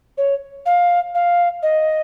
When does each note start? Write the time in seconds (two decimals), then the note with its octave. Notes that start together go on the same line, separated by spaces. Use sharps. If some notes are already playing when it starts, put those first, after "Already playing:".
0.18 C#5
0.66 F5
1.15 F5
1.63 D#5